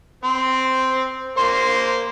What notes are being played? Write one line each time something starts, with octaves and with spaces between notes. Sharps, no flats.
C4 C5
A#3 C5 C6